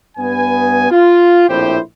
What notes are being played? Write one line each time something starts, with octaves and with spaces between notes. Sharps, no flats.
G2 B3 G#5
F4
A#1 A2 C4 E4 G4 C5